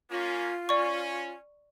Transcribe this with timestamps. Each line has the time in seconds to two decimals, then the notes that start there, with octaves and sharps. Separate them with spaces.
0.11 A#3 C#4 F4
0.69 C#4 D5 C#6